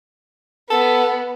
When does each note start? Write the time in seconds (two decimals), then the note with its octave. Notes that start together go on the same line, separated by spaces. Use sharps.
0.71 B3 A4